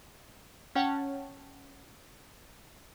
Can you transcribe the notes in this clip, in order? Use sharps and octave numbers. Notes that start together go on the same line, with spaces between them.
C#4 C#5 F#5 G5 A5